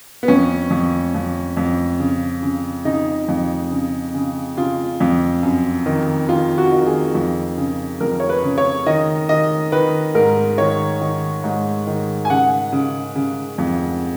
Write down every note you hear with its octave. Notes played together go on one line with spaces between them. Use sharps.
B3
F2 C#4
F2
F2
F2
C#3
C#3
C#3 D#4
F2
C#3
C#3
C#3 F4
F2
F#2
D#3
D#3 F4
F#4
D#3
G#4
F2
C#3
F2 A#4
C#5
B4
C#3
C#5
D#3 D#5
D#3 D#5
D#3 B4
G#2 A#4
D#3 C#5
D#3
G#2
D#3
G#5
C#3 F#5
C#3
C#3
F2